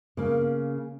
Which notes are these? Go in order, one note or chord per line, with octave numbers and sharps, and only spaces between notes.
C#3 A#3